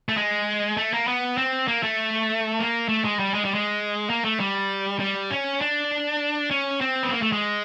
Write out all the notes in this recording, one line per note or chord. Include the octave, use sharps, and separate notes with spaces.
A3
G#3
A3
A#3
B3
C4
A#3
A3
A#3
A3
G#3
G3
G#3
G3
G#3
A#3
A3
G3
G3
C#4
D4
C#4
C4
B3
A#3
A3
G#3